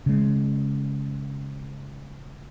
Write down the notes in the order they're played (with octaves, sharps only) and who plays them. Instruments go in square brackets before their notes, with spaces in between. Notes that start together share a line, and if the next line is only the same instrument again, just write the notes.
[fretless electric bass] C#3 G#3